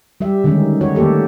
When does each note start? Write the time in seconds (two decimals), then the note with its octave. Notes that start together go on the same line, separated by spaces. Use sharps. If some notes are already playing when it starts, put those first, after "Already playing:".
0.20 G3 G4 E5
0.44 D3 D#3 G3 G#3 C#4 D#4
0.81 F#4 C#5
0.95 D#3 A3 A#3 G4 A4